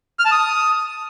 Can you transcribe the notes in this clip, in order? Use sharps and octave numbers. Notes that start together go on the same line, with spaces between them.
F6
A5
D#6